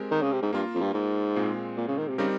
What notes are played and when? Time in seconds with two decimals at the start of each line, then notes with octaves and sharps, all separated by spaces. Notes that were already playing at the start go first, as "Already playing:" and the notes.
Already playing: G#3 C4 G4 A#4
0.11 D#3
0.22 C#3
0.32 C3
0.42 G#2
0.53 G2 A#3 F4 A#4
0.75 F2
0.81 G2
0.94 G#2
1.36 A#2 G#3 C4 F4
1.77 A#2
1.88 C#3
1.98 D#3
2.08 C3
2.18 C#3 G3 C4 D#4 G4 A#4